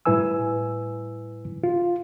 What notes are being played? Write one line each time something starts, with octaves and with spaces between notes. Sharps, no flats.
A2 G3 E4 B4 G#5 E6
F4